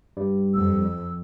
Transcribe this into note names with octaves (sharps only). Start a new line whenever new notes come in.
G2 G3
F2 E6